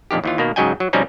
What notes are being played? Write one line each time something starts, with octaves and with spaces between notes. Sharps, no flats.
A#1 F2 D#3 G4
D#2 E3 F4
B2 D#3 A#3
G#2 C#3 F#3 D#5 G5 G#5
F#3
F2 B2 G3 C4 C#4 D#4